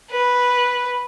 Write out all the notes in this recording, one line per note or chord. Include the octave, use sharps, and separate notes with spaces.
B4